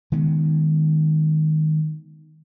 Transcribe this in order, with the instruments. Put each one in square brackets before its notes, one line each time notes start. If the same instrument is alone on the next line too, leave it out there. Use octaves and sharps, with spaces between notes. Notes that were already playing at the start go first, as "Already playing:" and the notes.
[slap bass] D#3 G#3 B3